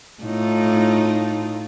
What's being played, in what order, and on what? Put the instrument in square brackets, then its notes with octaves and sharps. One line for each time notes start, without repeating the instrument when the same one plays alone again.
[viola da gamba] A2 D#4 F4